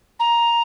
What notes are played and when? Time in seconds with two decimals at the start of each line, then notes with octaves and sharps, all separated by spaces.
0.19 A#5